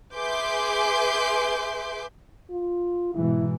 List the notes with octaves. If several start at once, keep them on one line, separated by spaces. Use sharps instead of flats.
G#4 B4 E5 C6 D6 G6
F4
G#2 B2 E3 E4